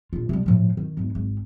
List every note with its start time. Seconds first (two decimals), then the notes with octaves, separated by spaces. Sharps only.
0.13 A#1 F4
0.29 C3 G3
0.46 A2 F3
0.77 D#3
0.97 E1 G#2
1.15 G#1